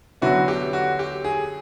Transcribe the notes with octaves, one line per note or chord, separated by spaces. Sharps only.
D3 F#3 B3 E4 F#4
G4
F#4
G4
G#4